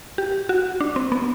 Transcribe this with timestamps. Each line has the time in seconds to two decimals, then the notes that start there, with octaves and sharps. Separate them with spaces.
0.18 G4
0.49 F#4
0.81 D4
0.96 C4
1.12 B3